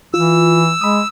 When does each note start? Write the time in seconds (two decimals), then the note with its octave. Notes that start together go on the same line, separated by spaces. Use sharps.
0.14 E3 F4 E6
0.81 G#3 B5 D#6